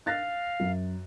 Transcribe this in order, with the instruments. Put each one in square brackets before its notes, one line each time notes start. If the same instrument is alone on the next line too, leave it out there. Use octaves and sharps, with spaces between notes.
[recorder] F5 [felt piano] F#6 A6 A#6
[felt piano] F#2